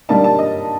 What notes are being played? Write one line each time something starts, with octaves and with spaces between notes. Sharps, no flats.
D3 G3 A#3 D#4 A5
A5
D#5